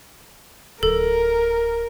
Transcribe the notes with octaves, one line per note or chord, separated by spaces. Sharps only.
D1 A4 A#4